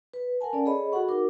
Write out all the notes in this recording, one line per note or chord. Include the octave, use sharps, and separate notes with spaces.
B4
A#4 F#5 G#5 A5
C#4 A4 D5
G#4 A4 C#5 D#5 B5
F#4 G#4 A4 F#5 C#6
D#4 F#4 A#4 D6